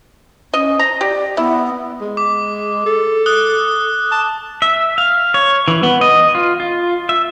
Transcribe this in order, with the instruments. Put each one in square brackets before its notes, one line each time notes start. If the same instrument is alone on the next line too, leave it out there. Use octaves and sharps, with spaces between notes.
[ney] C#4 [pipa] D#5
[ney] C5 [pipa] A#5
[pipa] G4 [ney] D5
[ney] B3 [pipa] E4
[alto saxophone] G#3
[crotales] D6
[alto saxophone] A4
[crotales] D#6 F#6 G7
[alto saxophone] A5
[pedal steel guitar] E5
F5
C#5
E3
B3
D#5
F4
F4
E5